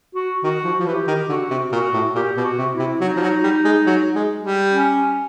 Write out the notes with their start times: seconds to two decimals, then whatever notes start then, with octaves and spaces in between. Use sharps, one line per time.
0.15 F#4
0.43 D#3 F#4
0.64 F3
0.80 F3
0.86 E3 G4
1.07 D#3
1.28 D3 F#4
1.50 C3
1.72 A#2 F#4
1.93 A2
2.14 A#2 G4
2.37 B2
2.43 F#4
2.58 C3
2.73 E4
2.79 C3
3.01 F#3 D#4
3.16 F3
3.22 F#3
3.43 G3
3.65 G#3
3.86 F#3
4.15 G#3
4.43 G3
4.73 C#4